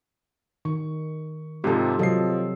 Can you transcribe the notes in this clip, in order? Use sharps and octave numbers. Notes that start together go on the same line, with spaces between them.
D#3 C#6
G#2 C3 F3 G4 A4
C3 F3 F#3 A4 D#5 C7